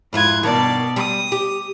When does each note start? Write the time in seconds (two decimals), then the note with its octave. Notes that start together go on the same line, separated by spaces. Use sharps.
0.13 F2 G#2 E4 F4 F#6 G#6
0.43 G2 B2 D#3 D5 A5
0.96 G3 D#6
1.32 G4